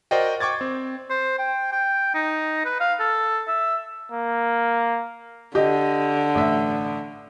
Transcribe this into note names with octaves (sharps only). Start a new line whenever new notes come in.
F#4 A#4 C5 D5 D#5 G5
G5 C#6 D6 G#6 A6
C4
C5
G5
G5
D#4
B4
F5
A4
E5
A#3
D3 G4 D#5
A1 E5